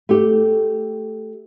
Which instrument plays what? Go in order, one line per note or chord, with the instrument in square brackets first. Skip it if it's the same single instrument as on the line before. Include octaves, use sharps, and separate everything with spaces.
[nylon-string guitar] A3 G4